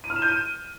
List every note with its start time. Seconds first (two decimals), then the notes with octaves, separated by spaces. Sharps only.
0.04 D#7
0.10 F6
0.16 E7
0.22 G6
0.28 D#7